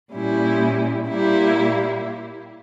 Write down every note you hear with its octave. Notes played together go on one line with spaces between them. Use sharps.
A#2 G3 C#4 E4
A#2 G3 A#3 E4